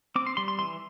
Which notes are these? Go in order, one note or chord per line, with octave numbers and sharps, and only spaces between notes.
C4 D6
C6
G3 C6
C6
E3 C6